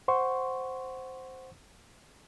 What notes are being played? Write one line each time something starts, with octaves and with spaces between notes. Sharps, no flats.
C5 F#5 C6 C#6